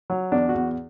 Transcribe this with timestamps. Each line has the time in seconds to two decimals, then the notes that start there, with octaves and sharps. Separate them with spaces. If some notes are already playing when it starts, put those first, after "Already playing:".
0.10 F#3
0.32 E2 D4
0.49 F#4
0.54 E2